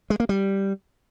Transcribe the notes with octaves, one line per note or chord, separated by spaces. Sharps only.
G#3
A#3
G3